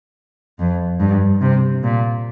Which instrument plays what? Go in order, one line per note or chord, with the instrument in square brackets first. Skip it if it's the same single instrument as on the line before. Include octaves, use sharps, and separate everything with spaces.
[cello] F2
G2
C3
A#2